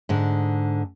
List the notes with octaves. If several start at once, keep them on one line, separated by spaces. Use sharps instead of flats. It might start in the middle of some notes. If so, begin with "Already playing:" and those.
G#2 D3